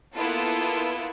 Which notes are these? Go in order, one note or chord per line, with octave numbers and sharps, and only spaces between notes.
A#3 B3 E4 F4 A4 B4